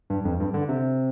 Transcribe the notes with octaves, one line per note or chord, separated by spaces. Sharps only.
G2
F2
G2
D3
C3